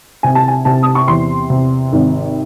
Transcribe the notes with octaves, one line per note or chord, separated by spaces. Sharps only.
C3 G#5
A5
G#5
C3 A5
D#6
C#6
E2 C6
C3
G#1